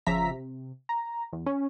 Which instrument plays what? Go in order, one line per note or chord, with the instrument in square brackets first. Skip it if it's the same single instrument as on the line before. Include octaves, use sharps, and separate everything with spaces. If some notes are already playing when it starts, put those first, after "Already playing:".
[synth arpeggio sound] G1 C#3 F3 E5 A#5 B6
C3
A#5
E2
C#4